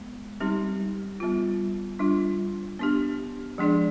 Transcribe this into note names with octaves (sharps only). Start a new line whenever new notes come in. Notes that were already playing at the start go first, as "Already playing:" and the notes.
Already playing: G#3 B3
G3 C4 D#4 G4
G3 B3 F4
G3 D4 F4
B3 D4 G4
F3 G#3 D4 G#4 D5